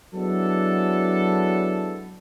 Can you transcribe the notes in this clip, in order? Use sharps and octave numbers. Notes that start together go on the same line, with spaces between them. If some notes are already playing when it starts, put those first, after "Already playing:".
F#3 G#3 B3 D4 E4 A4